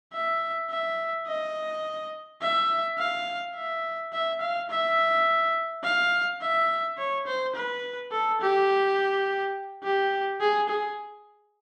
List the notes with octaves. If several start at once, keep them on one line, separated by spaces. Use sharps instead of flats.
E5
E5
D#5
E5
F5
E5
E5
F5
E5
F5
E5
C#5
C5
B4
A4
G4
G4
G#4
G#4